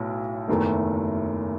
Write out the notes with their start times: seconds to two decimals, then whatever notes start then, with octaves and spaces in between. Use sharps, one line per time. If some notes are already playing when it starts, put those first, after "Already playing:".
Already playing: B1 A2
0.48 F#1 E2 D#3 A3